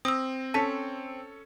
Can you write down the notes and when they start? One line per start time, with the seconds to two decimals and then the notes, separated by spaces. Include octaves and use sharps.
0.05 C4 D#6 E6 A#6
0.54 C#4 A4 A5 B6